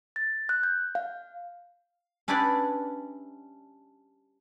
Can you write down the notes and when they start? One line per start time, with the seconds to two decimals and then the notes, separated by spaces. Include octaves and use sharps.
0.16 A6
0.49 F#6
0.63 G6
0.95 F5
2.28 C#4 D4 E4 G4 B4 D5